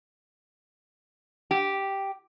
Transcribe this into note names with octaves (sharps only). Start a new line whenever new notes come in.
G4